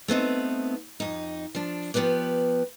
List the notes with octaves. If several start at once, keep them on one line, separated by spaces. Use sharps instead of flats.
A3 B3 C4 D#4
F2 D#4
F3 D4
F3 B3 G4 B4 D5